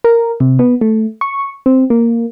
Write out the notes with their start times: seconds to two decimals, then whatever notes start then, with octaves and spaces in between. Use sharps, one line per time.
0.04 A#4
0.40 C3
0.59 B3
0.81 A3
1.21 C#6
1.66 C4
1.90 A#3